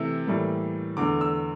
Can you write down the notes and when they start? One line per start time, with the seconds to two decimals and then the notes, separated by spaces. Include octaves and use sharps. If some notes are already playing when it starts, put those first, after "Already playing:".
Already playing: C3 E3 A3 E6
0.27 A2 E3 G3 A#3
0.97 E2 D3 A3 D6
1.21 E6